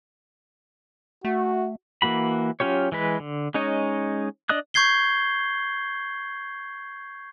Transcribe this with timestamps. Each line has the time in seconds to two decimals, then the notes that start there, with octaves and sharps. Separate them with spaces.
1.25 A3 F#4
2.02 E3 A#3 F#4 B5
2.60 F#3 C#4 F4 G4 C#5
2.92 E3 G#3 B4
3.20 D3
3.54 G#3 C#4 D#4 C#5 D#5
4.49 D4 D5 D#5 D#6 F#6
4.74 C#6 G6 G#6 C7 G7